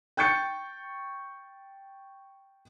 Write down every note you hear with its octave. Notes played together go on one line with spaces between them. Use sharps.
G5 C#6 G6 A6 C#7